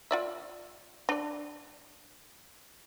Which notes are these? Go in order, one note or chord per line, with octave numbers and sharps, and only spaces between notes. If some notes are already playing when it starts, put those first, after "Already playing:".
F4 D5 E5
D4 D5